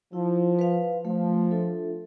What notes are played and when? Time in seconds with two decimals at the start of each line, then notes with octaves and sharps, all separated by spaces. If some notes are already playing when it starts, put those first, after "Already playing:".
0.13 F3 E4
0.59 B4 F5
1.05 F3 A3
1.51 D4 F4 A4 E5